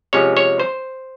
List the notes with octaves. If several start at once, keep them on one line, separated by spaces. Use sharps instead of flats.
C3 F3 G#3 C#4 C#5
C#5
C5